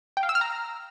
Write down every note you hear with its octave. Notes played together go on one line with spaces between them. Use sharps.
G5
F5
E6
F6
A#5